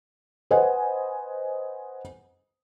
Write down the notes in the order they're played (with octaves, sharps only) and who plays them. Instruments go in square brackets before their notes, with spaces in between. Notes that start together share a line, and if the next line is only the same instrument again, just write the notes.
[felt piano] B4 C5 D#5 F#5 G#5